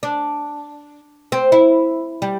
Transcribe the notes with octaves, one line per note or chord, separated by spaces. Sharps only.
D4
C4
E4
G3